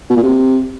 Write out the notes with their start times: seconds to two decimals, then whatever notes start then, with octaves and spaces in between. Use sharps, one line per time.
0.10 B2
0.16 A#2
0.23 C3